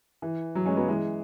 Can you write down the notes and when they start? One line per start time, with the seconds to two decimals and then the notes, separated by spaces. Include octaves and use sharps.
0.22 E3
0.55 F#3
0.66 G#3 C#4
0.77 F#3 B3
0.88 E3 G#3